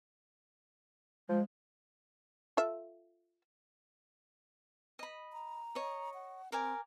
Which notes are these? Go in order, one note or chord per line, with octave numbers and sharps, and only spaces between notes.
F3 G#3
F4 A4 E5
D#5 B5
A#5
C#5 D#5
F#5
C4 A#4 D5 G#5